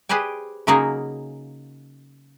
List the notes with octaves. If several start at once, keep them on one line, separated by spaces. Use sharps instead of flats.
G4 G#4 B4 C5 D5 G#5
C#3 F#3 A#3 D#4 G#4 A#4